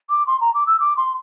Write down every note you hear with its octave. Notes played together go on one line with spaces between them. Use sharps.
D6
C6
A#5
D6
E6
D6
C6